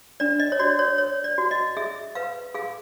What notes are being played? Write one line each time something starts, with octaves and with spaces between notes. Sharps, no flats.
D4 D5
D#5
C#5
F#4 D5
C#5
C#5
D5
F#4
D#5
G#4 E5
B4 F5
G#4 F5